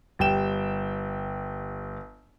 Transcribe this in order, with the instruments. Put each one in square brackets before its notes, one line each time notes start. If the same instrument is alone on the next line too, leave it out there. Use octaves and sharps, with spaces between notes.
[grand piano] G1 G3 G5 E7